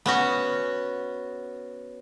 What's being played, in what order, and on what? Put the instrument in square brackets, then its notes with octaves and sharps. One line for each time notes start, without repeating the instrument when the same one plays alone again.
[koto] B3 C#4 F#4